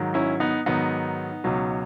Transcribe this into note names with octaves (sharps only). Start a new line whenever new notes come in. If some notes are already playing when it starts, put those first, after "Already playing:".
Already playing: G#2 D#3 F#3
C#4 E4
B3 D#4
G#2 D#3 F#3 B3 D#4
C#2 B2 F#3